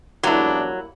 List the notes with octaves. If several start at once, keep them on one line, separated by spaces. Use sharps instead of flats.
E2 G#2 F#3 G3 A#3 D4 E4